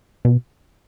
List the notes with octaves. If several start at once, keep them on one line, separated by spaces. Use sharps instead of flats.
B2